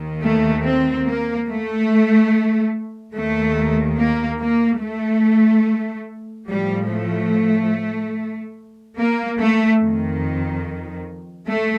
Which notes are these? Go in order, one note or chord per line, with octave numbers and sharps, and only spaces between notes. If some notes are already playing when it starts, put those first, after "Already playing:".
Already playing: D#2 D#3
A3
C4
A#3
A3
D#2 D#3 A3
A#3
A#3
A3
A2 F3 G3
A3
A#3
A3
F2 D#3
A3